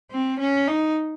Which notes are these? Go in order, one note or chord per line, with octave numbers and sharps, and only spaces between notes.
C4
C#4
D#4